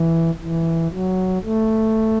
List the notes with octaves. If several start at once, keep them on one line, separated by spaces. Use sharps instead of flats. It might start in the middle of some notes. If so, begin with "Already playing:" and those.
Already playing: E3
E3
F#3
A3